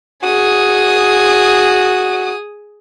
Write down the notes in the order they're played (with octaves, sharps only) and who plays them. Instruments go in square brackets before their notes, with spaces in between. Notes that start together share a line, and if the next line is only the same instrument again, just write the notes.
[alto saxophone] F#4 [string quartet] G#4 D#6